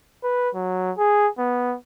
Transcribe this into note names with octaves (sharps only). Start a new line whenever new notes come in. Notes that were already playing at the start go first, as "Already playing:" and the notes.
B4
F#3
G#4
B3